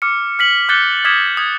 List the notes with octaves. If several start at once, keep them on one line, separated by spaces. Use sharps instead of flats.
D6 F6 C#7
F6 B6 F#7
D6 F#6 G6 A6 C#7 G7
D6 D#6 F6 G#6 B6 E7
D#6 G#6